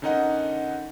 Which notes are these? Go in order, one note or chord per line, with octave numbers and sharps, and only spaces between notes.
D3 C#4 D#4 A#4 D#5 F#5